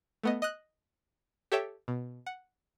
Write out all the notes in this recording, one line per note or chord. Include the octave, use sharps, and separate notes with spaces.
A3 B3 D#5
D#5 D#6 F#6
G4 A4 C#5 E5 G5
B2
F#5